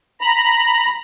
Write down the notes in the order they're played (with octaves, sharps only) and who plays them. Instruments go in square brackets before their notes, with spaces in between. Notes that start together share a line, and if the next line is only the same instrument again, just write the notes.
[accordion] A#5 B5